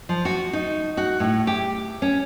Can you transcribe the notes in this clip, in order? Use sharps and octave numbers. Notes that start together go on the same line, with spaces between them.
F3
F#4
D#4
F#4
A2
G4
C#4